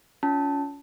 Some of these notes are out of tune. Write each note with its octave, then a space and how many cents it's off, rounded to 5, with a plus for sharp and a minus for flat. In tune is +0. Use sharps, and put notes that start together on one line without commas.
C#4 +30 F4 +5 A5 +0